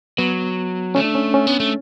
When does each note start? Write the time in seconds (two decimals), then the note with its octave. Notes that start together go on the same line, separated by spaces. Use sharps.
0.18 F#3 B3
0.95 A3 C#4
1.04 D4
1.15 C#4
1.34 C#4
1.47 B3
1.60 A3